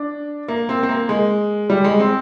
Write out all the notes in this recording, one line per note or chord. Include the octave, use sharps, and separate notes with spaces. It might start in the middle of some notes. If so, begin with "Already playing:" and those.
Already playing: D4
A#3
C4
C4
A#3
G#3
G3
G#3
C4